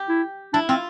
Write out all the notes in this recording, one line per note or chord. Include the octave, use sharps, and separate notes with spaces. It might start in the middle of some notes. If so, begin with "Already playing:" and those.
Already playing: G4
E4
D4 E4
C4 F4